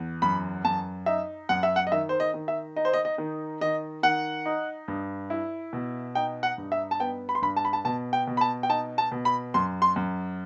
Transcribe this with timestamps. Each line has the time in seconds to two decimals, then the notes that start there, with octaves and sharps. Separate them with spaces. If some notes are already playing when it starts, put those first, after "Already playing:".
Already playing: E2
0.22 F#2 B5
0.65 F#2 A5
1.06 D#4 E5
1.49 F#2 F#5
1.63 E5
1.76 F#5
1.87 D#5
1.92 D#3 E5
2.09 C5
2.20 D#5
2.34 D#3
2.48 E5
2.76 D#4 D#5
2.85 C5
2.93 D#5
3.05 D#5
3.18 D#3
3.61 D#3 D#5
4.03 D#3 F#5
4.46 D#4
4.88 G2
5.30 E4
5.73 B2
6.15 D#4 G5
6.43 F#5
6.58 G2
6.72 E5
6.91 A5
7.00 B3 G5
7.29 B5
7.35 C6
7.42 G2 B5
7.57 A5
7.65 B5
7.73 A5
7.85 B2 A5
8.13 G5
8.27 B2
8.37 B5
8.41 A5
8.63 G5
8.69 D#4 A5
8.98 A5
9.12 B2
9.25 B5
9.54 F#2 C6
9.82 C6
9.96 F#2